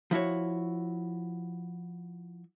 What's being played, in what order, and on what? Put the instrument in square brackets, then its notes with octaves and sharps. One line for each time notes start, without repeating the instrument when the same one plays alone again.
[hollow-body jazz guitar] F3 E4 F#4 C#5